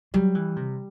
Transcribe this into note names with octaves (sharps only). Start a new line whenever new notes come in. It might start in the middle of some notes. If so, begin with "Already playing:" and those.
F#3 G3
E3
C3